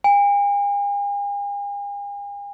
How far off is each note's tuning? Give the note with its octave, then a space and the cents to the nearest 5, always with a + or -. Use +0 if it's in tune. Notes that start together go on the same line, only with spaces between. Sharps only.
G#5 -45